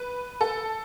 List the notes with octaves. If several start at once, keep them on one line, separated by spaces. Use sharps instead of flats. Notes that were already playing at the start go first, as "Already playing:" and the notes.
Already playing: B4
A4